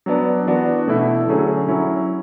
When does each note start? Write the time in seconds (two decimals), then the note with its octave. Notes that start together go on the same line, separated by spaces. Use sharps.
0.06 F#3 B3 D4
0.47 E3 B3 D4 F#4
0.88 B2 A3 E4
1.27 D3 F#3 A3 C#4 G#4
1.68 F#3 C#4 E4